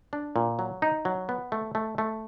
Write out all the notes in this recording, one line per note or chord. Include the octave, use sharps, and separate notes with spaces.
D4
A#2
F#3
D#4
F#3
B3
A3
A3
A3